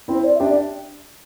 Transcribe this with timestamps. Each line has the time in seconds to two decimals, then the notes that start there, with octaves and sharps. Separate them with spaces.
0.08 C4 E4
0.14 C5
0.24 D5
0.35 E5
0.40 D4 G4
0.46 D5